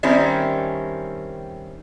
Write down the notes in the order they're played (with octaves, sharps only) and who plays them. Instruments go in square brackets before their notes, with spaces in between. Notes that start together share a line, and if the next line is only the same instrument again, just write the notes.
[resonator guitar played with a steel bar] D#3 G3 C4 C#4 E4